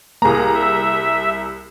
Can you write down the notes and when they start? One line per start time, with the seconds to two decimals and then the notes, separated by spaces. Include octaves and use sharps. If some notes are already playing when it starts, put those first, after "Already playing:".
0.22 C2 A#3 G#4 A#5
0.55 E5